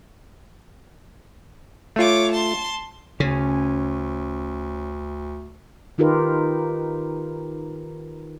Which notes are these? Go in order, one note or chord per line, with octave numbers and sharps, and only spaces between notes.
A3 F4 C#5 D6
A5 C6
D2 C#3 C#4 G#5
D#3 D#4 F4 G4 A#4 B4